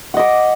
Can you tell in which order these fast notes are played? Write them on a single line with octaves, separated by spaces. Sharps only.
F#5 D#5 D6